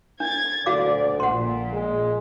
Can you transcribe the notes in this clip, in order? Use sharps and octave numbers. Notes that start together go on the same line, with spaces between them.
D4 G#6 A6
D2 F#4 D5 F5 D6
A#1 A#2 F#5 C6
G#3